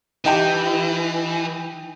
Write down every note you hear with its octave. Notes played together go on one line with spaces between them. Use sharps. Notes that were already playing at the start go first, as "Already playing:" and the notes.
E3 D#4 G4 G5